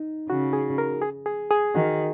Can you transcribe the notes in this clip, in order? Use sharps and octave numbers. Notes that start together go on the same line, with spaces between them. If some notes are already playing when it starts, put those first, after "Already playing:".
Already playing: D#4
C#3 F#4
G#4
A#4
G#4
G#4
G#4
D#3 F#4